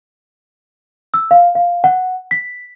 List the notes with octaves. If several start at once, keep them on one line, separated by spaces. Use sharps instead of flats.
E6
F5
F5
F#5
B6